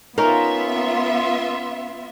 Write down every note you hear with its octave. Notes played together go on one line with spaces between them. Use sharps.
B3 C#4 D#4 F4 A#4 E5